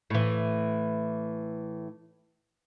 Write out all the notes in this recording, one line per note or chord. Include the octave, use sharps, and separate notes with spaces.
A2 E3